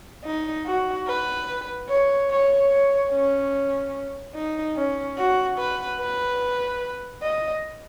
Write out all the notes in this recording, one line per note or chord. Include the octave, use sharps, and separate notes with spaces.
D#4
F#4
B4
C#5
C#5
C#5
C#4
D#4
C#4
F#4
B4
B4
D#5